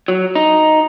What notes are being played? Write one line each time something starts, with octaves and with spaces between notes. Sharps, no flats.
F#3
D#4